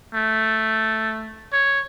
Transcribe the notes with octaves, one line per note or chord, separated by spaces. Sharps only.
A3
C#5